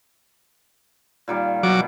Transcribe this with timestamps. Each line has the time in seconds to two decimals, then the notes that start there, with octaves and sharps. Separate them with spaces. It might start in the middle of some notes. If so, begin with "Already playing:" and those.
1.28 A#2 D#3 G3
1.63 B2 D#3 F#3 D6